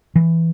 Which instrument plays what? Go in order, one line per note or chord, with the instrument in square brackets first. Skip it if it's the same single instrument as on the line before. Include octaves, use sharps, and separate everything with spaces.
[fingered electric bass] E3